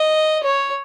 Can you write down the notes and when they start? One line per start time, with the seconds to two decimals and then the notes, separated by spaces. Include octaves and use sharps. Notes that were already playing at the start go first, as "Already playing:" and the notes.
Already playing: D#5
0.44 C#5